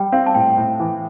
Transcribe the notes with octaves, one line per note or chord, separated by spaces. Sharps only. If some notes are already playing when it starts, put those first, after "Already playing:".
Already playing: G3 G5
C4 F5
A5
A2 G5
A2
E3